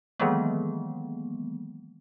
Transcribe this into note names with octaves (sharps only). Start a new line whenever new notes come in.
D#3 E3 F#3 G#3 A#3 B3